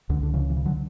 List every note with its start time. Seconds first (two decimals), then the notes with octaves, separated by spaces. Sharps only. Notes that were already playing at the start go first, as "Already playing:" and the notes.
0.09 C#2 D3
0.23 D3
0.33 C#3 E3
0.50 E3
0.57 C#3
0.65 D3 F#3